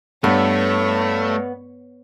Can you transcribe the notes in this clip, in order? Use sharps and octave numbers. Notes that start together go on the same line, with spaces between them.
G2 A3 B3 C#5